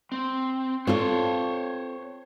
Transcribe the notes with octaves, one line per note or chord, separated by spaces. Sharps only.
C4
C4 F4 A4 C5 C#5